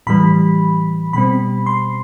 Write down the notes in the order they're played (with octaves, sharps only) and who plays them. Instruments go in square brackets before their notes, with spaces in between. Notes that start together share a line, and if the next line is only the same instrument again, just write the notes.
[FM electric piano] A2 E3 G3 B5
B2 G3 C4 B5
C6